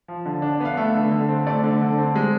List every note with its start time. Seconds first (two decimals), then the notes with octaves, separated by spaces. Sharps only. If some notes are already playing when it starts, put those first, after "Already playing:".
0.08 F3
0.25 D3
0.42 D4
0.60 B3 F5
0.77 A3 E5
0.94 D3
1.11 D3
1.29 C4
1.46 A3 D5
1.63 D3
1.82 D3
1.98 C4
2.16 G#3